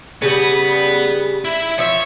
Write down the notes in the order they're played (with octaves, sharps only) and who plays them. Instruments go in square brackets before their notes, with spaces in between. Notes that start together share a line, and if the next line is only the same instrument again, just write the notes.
[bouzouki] C#3 G3 [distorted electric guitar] B3
[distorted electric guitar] E4 E5
[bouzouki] F3 E5 [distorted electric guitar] C#5